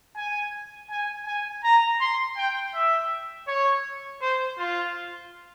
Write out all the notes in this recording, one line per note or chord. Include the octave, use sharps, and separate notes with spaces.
G#5
G#5
G#5
A#5
C6
G5
E5
C#5
C5
F4